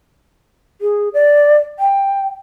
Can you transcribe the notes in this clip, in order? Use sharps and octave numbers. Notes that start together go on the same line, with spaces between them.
G#4
D5
G5